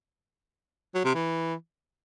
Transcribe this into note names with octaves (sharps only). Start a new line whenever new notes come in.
F#3
C3
E3